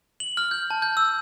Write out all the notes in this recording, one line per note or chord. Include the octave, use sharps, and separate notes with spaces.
F#7
F6
G6
A5
G6
E6